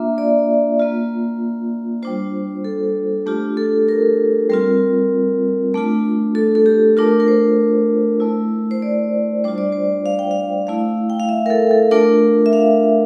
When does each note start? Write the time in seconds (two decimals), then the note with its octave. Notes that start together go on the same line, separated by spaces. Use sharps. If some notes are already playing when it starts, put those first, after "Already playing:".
Already playing: A#3 D4 F4 E5
0.18 D5
0.79 A#3 F4
2.02 G3 D4 F4 C5
2.65 A4
3.26 A3 D4 F4 G4
3.57 A4
3.89 A#4
4.49 G3 C4 F4 A#4
5.74 A3 D4 F4
6.35 A4
6.55 A4
6.66 G4
6.97 A3 D4 F4 A#4
7.20 A#4
7.28 C5
8.20 A3 E4
8.71 C5
8.82 D5
9.44 G3 D4 F4 C5
9.58 D5
9.72 C5
10.06 F5
10.19 G5
10.31 F5
10.67 A3 E4 F5
11.10 G5
11.20 F5
11.29 E5
11.46 A#4
11.50 A4
11.71 A4
11.91 A3 D4 F4 A#4
12.46 E5
12.53 F5